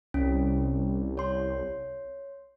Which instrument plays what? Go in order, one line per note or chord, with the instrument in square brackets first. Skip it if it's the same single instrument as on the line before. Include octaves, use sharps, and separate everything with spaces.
[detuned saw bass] C2 [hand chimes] C#4
[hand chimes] C#5 C6